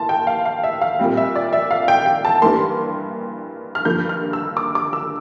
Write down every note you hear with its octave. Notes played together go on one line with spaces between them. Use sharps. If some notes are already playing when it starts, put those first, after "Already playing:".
Already playing: A2 E3 A#3 A5 C6
G5
F5
F5
E5
F5
A#2 G3 C4
E5
D5
E5
F5
G5
G5
A5
G2 E3 G3 A#3 C6
F6
G2 D3 F3 A#3 G6
F6
E6
D6
D6
E6